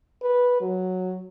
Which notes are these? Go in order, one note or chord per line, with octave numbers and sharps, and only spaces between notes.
B4
F#3